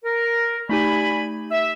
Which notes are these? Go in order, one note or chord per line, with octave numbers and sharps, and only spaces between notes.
A#4
A3 D#4 G4 D5 G#5 B5
E5